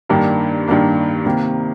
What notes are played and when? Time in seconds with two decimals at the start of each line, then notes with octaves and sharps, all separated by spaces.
0.09 G2 D#3 A#3 D4
0.68 G2 D#3 A#3 D4
1.26 C3 D#3 A#3